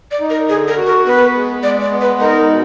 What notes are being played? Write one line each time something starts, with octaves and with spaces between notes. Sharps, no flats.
D5
D#4
A#4
D3 G#4
A#4
F#4
A#4
B3 B4
G#3
G#3 D5
D5
B3
B4
D#4 A#4
B2